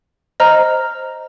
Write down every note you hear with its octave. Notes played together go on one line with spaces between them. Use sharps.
C5 D#5 A#5 F6